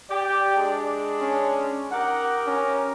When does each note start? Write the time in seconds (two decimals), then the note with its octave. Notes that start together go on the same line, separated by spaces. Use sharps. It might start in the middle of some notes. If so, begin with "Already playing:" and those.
0.10 G4 D5
0.55 G#3 D4
1.22 C#4
1.92 D#4 G4 A#4 F#5
2.46 C#4